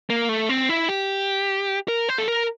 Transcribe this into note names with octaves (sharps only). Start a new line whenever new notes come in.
A#3
A3
C4
E4
G4
A#4
C5
A4
A#4